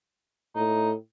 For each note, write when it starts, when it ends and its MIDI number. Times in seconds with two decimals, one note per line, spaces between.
0.56 0.94 45
0.56 0.90 63